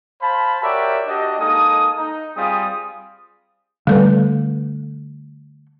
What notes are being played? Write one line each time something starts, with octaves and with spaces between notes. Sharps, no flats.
C5 F5 A5 B5
F#4 G4 A#4 C#5 D5 E5
D4 F#4 G4 D#5
G#3 A#3 D#4 A4 D#6
D#4
G3 C4 F4 G#4 D#6
D3 G3 A3 A4 B4